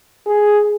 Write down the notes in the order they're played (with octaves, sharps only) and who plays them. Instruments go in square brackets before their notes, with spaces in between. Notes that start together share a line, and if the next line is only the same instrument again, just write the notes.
[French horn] G#4